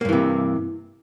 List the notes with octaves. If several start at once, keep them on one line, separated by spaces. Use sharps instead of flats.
G2 C3 E3 A#3